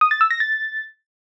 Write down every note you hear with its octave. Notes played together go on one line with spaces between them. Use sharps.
D#6
A6
E6
A#6
A6